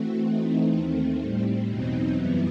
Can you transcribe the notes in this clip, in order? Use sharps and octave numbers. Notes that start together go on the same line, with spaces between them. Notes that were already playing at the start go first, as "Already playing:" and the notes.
Already playing: E3 A3 C4 F#4
E3 A3 C4 D#4
D#2 D#3 A3 C4
A2 G3 C4
E2 B2 F#3 C4 D#4
F#2 E3 G3 B3 E4